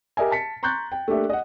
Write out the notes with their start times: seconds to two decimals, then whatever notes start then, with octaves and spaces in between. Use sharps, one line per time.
0.17 G4 A#4 D#5 E5 G#5
0.32 A5 B6 C#7
0.63 A#5 C6 C#6 F#6 G6 A6
0.92 G5
1.08 A3 A#3 D4 G4 E5
1.30 D#5 F#5